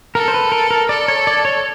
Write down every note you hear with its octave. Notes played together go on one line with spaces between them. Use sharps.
A4 A#4
C5
B4
A#4
A#4
A4 D5
C#5
D5
C#5